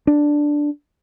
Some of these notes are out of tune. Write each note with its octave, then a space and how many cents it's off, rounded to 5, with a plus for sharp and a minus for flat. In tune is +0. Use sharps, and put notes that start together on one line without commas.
D4 +0